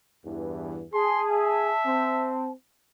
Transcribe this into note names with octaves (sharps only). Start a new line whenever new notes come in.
E2 G2 E3
G#4 A5 C6
E5
C4